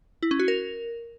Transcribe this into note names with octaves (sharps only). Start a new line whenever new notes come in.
E4
C#4
F#4
A#4